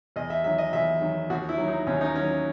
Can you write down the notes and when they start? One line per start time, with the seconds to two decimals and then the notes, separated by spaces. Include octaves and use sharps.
0.16 E2 D#5
0.30 E5
0.44 D#3 F#3 E5
0.58 D#5
0.73 E2 E5
1.02 D#3 F#3
1.30 D#2 F#4
1.49 E4
1.58 D#3 F#3
1.68 D#4
1.87 D#2 C#4
2.01 D#4
2.16 D#3 F#3 C#4